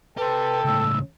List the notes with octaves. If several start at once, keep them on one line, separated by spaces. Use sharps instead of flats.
G4 A4 B4 C5 G5
C#2 A2 E6